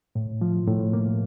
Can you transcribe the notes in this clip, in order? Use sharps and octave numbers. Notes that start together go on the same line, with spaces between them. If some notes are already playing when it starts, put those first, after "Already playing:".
A2
F3
A2
A#3